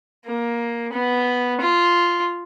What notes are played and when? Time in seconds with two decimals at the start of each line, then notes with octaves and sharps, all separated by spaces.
0.26 A#3
0.93 B3
1.60 F4